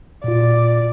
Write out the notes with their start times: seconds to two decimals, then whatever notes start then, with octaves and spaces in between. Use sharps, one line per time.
0.24 A#2 F4 D5